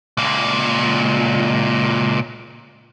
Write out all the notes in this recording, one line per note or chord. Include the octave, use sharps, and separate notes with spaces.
C#2 A#2